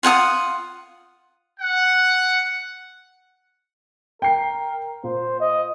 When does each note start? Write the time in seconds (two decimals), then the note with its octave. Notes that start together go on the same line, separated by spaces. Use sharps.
0.03 F4 F#5 G#5 D#6
1.60 F#5
4.22 A#4 G5 C7
5.04 A#2 C5
5.40 D#5